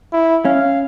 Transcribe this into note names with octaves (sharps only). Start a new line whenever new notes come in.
E4
C#4 F5